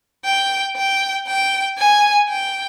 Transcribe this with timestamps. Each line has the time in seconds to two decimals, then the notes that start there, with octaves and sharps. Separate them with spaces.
0.25 G5
0.76 G5
1.27 G5
1.78 G#5
2.29 G5